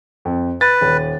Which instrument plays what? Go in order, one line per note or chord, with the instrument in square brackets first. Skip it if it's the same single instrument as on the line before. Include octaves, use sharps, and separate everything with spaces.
[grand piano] F2
[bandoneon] B4 [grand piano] A6
[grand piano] D#1